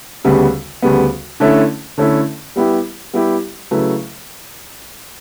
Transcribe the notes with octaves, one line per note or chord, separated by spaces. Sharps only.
D2 C#3 G3 B3
D2 C#3 G3 B3
D3 A3 C#4 E4
D3 A3 C#4 E4
G3 B3 E4 G4
G3 B3 E4 G4
C#3 F#3 A3 E4 B4